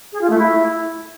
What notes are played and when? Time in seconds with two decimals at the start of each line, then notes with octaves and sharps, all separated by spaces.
0.13 G#4
0.21 F4
0.30 A3
0.39 E4